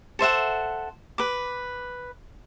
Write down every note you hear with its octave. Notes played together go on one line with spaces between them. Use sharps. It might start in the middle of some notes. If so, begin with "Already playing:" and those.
A4 C5 E5 F#5
B4 D6